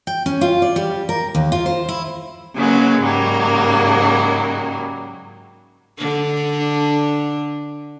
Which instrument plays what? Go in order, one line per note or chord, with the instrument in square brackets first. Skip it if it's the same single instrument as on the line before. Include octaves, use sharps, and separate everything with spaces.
[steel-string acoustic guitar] G5
C#4
F4
D5
G3
A#4
D#2
F4
C5
E4
[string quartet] C#3 F#3 G#3 A#3 B4
G#2 C#3 F#3 G3 A#3
[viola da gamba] D3 D4